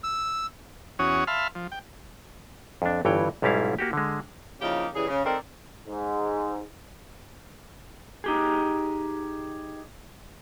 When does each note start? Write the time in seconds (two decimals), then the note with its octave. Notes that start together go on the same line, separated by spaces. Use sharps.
0.04 E6
0.99 E2 C#4 F#4 C#5 D#6
1.27 E5 F5 A5 B5 C6 F6
1.55 F3
1.72 G5
2.82 F2 D4
3.05 G1 G2 E3 C#5 G5
3.42 B1 G#2 G3 C#4 E4 F5
3.79 A#3 F#4 G4
3.93 D3 G#3
4.61 C#3 F3 A#3 D#4 E4 G4
4.94 C#3 E3 G3 G#4
5.08 C#3
5.24 D#3 C4 A4 A#4 C5 D5
5.87 G#2
8.24 D#4 G4 G#4